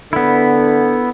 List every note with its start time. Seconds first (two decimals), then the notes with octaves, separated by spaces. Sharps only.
0.13 D3 B3 E4